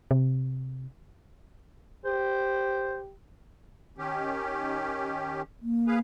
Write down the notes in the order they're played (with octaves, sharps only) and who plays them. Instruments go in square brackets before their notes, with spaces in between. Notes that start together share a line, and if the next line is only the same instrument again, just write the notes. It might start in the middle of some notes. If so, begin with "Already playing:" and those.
[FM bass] C3
[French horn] G4 [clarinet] C5
[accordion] D#3 C#4 G4
[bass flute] A#3
[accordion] G#4 B4 F5